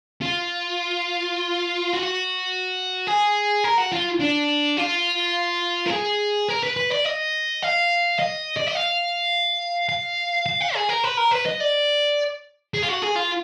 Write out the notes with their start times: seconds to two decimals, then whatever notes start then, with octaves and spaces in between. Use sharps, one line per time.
0.22 F4
1.93 F#4
3.07 G#4
3.64 A#4
3.78 F#4
3.93 F4
4.20 D4
4.78 F4
5.87 A#4
5.91 G#4
6.49 A#4
6.63 B4
6.76 B4
6.90 D5
7.05 D#5
7.63 F5
8.19 D#5
8.57 D5
8.67 D#5
8.75 F5
9.89 F5
10.46 F5
10.61 F#5
10.74 G#4
10.89 A#4
11.04 B4
11.17 A#4
11.31 B4
11.46 D#5
11.61 D5
12.74 G#4
12.83 F4
12.89 F#4
13.02 G#4
13.16 F4